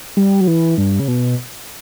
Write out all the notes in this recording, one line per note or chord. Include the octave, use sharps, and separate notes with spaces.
G3
F#3
E3
G2
C#3
B2